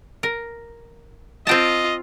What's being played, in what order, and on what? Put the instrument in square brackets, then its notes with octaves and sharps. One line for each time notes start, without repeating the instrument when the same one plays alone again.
[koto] A#4
[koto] C4 G5 A5 [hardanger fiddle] F4 [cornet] D#5